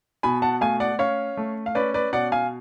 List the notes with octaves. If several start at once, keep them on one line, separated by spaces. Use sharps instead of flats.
B2 G#5 B5
F#5 A5
A3 F5 G#5
D5 F#5
C#4 C#5 F5
A3
F5
C#4 B4 D5
B4 D5
B2 D5 F#5
F5 G#5